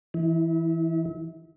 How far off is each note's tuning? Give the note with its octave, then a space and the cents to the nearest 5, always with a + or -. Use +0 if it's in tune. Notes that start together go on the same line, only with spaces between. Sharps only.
E3 +0 E4 -40